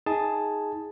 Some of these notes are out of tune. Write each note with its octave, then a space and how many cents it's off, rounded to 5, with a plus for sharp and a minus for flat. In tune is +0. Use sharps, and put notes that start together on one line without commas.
D#4 +30 G#4 +0 A5 +0